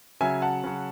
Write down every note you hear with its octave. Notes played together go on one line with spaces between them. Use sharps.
C#3 F#3 E5 G#5
F#5 A5
C#3 F#3